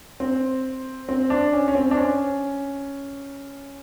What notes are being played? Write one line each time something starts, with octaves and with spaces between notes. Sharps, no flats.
C4
C4
D4
C#4
C#4
C4
D4
C#4